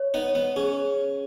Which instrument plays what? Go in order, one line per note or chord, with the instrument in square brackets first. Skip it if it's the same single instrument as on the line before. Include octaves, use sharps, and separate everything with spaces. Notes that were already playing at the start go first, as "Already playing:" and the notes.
Already playing: [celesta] C#5
[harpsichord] B3 D#4
[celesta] C#5
[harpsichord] B3
[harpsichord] C#4 [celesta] G#4